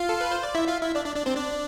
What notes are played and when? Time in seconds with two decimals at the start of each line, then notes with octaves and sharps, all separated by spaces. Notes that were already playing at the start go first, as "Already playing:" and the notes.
Already playing: F4 F5
0.09 A4
0.21 B4
0.31 C5
0.43 D5
0.55 E4 E5
0.68 F4 F5
0.82 E4 E5
0.95 D4 D5
1.05 D4 D5
1.16 D4 D5
1.26 C4 C5
1.36 D4 D5